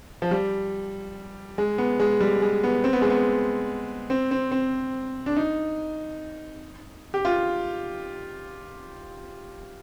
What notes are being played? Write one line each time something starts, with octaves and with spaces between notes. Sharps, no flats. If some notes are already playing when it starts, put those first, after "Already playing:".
F3
G3
G#3
B3
G#3
G3
G#3
B3
C4
B3
G#3
B3
C4
C4
C4
D4
D#4
G4
F4